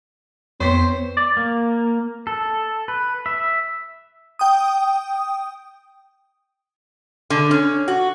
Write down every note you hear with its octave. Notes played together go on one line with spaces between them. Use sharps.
F2 B3 C4 C5 C#5 B6
D5
A#3
A4
B4
E5
G5 D#6
D3
C#4
F#4